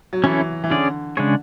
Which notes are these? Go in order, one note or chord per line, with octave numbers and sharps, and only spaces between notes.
F#3
E3 C#4 E4 A4
E3
D3 C#4 G#4 D5
C#3 G#3 D4 G#4 C#5